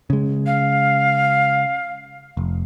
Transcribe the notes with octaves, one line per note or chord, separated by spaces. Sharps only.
C#3 G#3
F5
F1